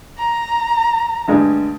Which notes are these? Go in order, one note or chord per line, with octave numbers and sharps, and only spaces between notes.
A#5
D2 G2 G#3